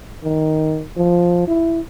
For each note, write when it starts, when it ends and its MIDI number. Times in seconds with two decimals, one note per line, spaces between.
0.24 0.83 51
0.97 1.45 53
1.48 1.80 64